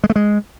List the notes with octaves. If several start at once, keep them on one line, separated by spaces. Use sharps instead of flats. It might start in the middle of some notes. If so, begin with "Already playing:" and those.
G#3
A3
G#3